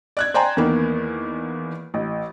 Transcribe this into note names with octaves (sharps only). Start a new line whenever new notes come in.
D5 F#6 G#6
C5 D5 G5 G#5 A#5 C6
E2 D#3 A#3 B3
A1